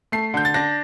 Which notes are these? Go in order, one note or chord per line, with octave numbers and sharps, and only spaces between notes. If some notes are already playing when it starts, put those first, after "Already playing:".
A3 C7
D3 G6
A6
D4 A#6